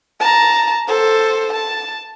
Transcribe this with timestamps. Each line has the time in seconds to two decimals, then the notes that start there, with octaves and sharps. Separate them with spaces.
0.20 A5 A#5
0.88 A4 C5
1.53 A5